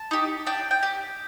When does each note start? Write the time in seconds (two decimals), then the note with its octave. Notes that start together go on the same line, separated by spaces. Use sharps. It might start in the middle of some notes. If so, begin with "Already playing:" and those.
Already playing: A5
0.11 D#4 G4
0.47 D4 G5
0.71 G5
0.83 G4